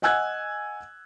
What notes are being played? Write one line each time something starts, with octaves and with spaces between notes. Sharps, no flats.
D#5 F#5 G#5 E6 F#6 G#6